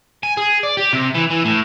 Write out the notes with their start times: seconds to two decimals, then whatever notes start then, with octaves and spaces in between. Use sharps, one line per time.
0.23 G#5
0.37 G#4
0.63 D5
0.77 G4
0.93 C3
1.14 E3
1.30 E3
1.45 A2